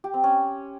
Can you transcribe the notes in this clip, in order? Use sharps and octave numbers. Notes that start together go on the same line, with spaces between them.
G4
C4
C#4